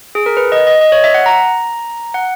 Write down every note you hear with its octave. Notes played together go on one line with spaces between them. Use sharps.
G#4
A#4
B4
D#5
D#5
D#5
C#5
E5
F#5
A#5
F#5